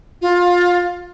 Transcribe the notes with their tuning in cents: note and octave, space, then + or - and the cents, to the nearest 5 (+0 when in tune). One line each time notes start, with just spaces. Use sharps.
F4 +20